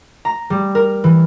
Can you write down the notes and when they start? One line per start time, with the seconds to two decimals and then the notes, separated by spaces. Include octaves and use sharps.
0.25 A#5
0.50 G3
0.75 A#4
1.04 E3